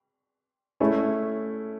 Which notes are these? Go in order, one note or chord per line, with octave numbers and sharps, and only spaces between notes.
A3 C#4 E4